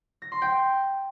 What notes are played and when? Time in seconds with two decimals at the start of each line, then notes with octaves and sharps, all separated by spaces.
0.22 A#6
0.32 C6
0.42 G5